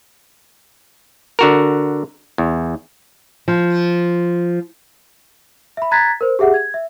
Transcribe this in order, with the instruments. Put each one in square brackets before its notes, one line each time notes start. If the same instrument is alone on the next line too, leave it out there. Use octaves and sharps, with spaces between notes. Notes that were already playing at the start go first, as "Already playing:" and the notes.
[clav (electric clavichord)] D3 F#4 A#4
E2
[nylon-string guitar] F3
[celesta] E5 B5
A#5 F#6 G#6 A6 B6
A#4 C5
G4 G#4 E5 F#5
G#6
E5